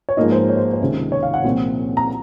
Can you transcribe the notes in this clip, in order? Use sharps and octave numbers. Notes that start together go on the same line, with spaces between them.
C#5
G#2 F3 A#3 D#4 D#5
C5
C#5
C5
C5
C#2 C3 D#3
C#5
F5
F#5
C2 A#2 F3 C4
A#5